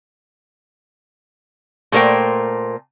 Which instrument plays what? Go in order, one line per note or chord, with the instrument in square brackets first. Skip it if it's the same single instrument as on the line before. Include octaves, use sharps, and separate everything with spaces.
[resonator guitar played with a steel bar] A#2 A3 A#4 C5 G5